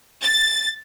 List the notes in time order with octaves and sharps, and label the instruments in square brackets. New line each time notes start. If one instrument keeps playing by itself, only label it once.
[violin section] A6